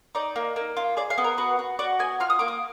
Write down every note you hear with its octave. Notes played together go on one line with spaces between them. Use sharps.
D#4 D5
A#3
A#3
F4
G#4 D5
F5
B3
A#4
F#4 B4
F#4
F#4 D5
B3 G#5
F4 F6
D#6
A#3 D6
D#6